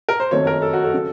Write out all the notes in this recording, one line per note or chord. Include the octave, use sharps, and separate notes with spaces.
A#4
C5
F#1 F2 D#3 F#3 A3 C#5
A#4
A4
F#4
A4
C#3 F#3